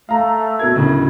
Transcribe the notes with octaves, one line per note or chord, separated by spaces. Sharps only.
A3 F5 A#5
B2 A#4 G#6
D1 A2 C#3